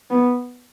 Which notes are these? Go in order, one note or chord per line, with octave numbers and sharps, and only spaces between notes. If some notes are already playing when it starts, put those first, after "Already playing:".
B3